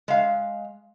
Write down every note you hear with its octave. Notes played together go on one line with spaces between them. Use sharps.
G#3 F5